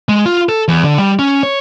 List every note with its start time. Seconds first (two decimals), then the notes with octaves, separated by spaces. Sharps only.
0.09 G#3
0.26 F4
0.49 A4
0.68 E2
0.84 D3
0.98 G3
1.19 C#4
1.43 C#5